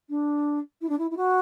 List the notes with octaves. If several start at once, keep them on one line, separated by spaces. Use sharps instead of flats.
D4
E4
D4
E4
E4
F#4